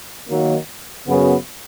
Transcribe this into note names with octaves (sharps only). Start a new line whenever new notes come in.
D#3 F#3 A#3
F#2 C#3 F#3 B3